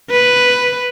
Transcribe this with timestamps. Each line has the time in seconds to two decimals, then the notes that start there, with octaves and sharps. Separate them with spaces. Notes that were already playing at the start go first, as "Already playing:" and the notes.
0.11 B4